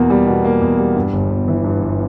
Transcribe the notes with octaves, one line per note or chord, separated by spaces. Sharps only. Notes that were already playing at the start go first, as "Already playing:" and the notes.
Already playing: E2 B2 A#3
G3
B2
A#3
E2
G3
G2
G1
G1
E3
G2
G1